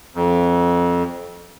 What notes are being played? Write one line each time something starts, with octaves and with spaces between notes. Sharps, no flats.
F2